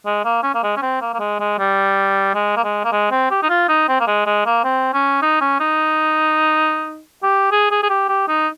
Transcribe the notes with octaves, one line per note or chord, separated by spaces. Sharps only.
G#3
A#3
C#4
A#3
G#3
C#4
C4
A#3
A#3
G#3
G#3
G3
G#3
A#3
G#3
A#3
G#3
C4
G4
D#4
F4
D#4
C4
A#3
G#3
G#3
A#3
C4
C#4
D#4
C#4
D#4
G4
G#4
G#4
G#4
G4
G4
D#4